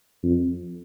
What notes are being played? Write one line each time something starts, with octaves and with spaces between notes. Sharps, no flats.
F2